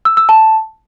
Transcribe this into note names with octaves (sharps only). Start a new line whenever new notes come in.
E6
E6
A5